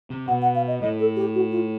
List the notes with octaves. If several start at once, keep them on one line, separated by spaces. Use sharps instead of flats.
C3
B2 F#5
F#5
F5
D#5
A2 D#5
A4
G4
F#4
F4